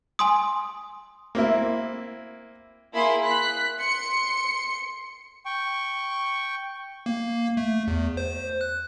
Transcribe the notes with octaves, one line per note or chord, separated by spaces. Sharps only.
G#5 C6 D#6
A#3 C4 E4
A#3 E4 G#4 B5 C6
F#6 B6
C6 C#7
G5 C#6
A#3
A3
E2
C5
F#6